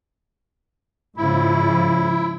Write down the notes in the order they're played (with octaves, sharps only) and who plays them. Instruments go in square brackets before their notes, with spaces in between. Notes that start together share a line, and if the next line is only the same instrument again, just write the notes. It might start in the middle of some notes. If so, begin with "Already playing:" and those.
[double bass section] G#2 C#3 F3 [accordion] E4